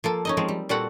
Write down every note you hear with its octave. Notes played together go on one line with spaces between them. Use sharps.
F3 A#3 A4
C#4 D#4 D#5
F3 G#3 C4
G3
A#2 G3 C4 F#4 A4 F#5